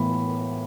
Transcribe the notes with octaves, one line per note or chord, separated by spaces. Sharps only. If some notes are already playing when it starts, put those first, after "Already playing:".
Already playing: A2 E3 B3 B5